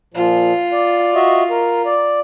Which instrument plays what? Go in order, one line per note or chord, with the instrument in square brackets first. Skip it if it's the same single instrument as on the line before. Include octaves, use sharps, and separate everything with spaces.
[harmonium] A#2 F3 [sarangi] F4
[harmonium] D5
F#4 D#5 E5
A#4
D5